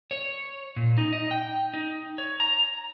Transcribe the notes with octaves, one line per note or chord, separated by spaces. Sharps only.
C#5
A#2
D#4
D#5
G5
D#4
C#5
A#5